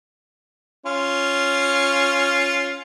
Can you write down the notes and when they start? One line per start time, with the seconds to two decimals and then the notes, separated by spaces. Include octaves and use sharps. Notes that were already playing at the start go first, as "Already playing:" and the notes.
0.86 C#4 F4